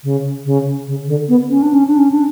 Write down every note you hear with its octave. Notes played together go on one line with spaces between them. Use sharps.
C#3
C#3
C#3
D3
B3
C#4
D4
C#4
D4
C#4
D4